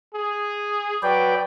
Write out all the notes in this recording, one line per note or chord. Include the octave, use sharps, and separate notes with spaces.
G#4
F#3 B4 D5 G5